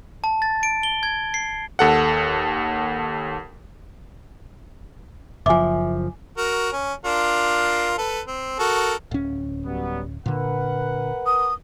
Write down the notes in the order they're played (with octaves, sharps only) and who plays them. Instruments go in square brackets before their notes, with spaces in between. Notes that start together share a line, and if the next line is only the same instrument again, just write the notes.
[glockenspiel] A5
A6
D7
G7
G#6
C7
[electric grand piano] D#2 A4 F#5
[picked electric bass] F#1 F3 [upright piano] E5 [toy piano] G#5 D6
[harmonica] F#4 A#4
C#4
D4 F4 A#4
A4 B4
C4
F#4 A4 A#4
[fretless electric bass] D1 C#4
[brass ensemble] F#3 G3 B3
[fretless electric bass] A#2 D3 [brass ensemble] A#4 B4 F#5
[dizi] D#6